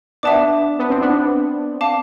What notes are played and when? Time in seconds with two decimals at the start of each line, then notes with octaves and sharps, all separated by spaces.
0.23 B3 D4 E5 A5 D6
0.79 B3
0.90 C4
1.01 B3 D4
1.81 F5 A5 D6